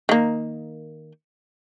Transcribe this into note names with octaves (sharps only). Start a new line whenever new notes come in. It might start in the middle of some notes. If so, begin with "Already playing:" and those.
D#3 A#3